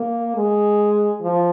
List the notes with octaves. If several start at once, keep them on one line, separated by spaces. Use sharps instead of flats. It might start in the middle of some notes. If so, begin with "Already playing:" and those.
Already playing: A#3
G#3
F3